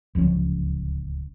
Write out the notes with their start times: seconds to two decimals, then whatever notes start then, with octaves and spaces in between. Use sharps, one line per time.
0.15 D1 C#2 F3 C#4